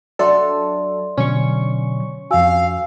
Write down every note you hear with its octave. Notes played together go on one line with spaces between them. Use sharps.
F#3 D4 A4 D5 E5 C6
B2 D3 F#3 C#4 C#6
F2 F#4 F5 G#5 E6